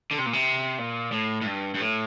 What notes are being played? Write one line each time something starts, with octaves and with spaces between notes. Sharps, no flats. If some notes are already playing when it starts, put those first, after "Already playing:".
D3
C3
A#2
C3
A#2
A2
A2
G2
G2
A2